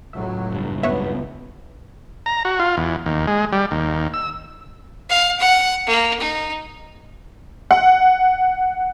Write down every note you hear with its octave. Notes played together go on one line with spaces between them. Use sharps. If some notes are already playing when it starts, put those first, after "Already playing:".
C#2 A2 F#3 E5
F#1 G2
C#2 B3 B4 C#5 E5
A#5
F#4
F4
E2
D#2
G#3
G3
D#2
E6
F5
F#5
A#3
D#4
F#5